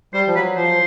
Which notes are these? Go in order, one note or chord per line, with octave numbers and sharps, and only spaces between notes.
G3 C5
F3
F#3 B4
F3 C5